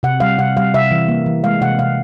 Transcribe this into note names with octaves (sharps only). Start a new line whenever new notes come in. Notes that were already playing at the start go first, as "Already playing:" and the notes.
C3 F#5
G3 F5
C3 F#5
G3 F5
C3 E5
E3
A#3
E3
G#3 F5
C3 F#5
C3 F5